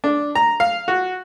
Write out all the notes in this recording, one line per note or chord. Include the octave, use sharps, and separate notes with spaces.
D4
A#5
F5
F#4